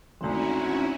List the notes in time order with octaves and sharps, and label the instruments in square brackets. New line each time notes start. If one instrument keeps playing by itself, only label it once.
[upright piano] G#1 D2 [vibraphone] C4 D#4 A#5 [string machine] C#4 E4 F#4